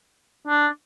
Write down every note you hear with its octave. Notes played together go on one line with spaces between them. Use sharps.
D4